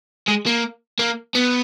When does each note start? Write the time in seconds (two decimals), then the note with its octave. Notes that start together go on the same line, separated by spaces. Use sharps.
0.28 G#3
0.47 A#3
0.99 A#3
1.35 B3